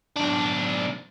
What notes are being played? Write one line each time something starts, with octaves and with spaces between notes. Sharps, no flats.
B1 D4